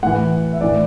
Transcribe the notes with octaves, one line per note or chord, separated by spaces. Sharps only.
A2 E3 F#5
E5
A2 E3 D5